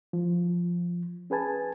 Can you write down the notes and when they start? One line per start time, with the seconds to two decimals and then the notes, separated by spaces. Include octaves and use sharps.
0.13 F3
1.30 C#4 G#4 B4 G#5 A5